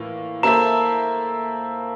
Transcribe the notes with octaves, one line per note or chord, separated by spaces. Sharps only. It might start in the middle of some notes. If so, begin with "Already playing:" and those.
Already playing: A2 E3 A#3 F4
A#3 E4 A4 C5 E5 A#5